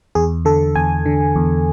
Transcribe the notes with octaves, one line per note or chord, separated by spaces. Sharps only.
E2 G#4
D3 A4
E2 G#5
D3
E2